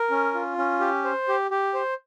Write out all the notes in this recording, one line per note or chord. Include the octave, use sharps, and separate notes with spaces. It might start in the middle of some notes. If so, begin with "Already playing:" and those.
Already playing: A#4
C#4
F4
C#4
G4
C5
G4
G4
C5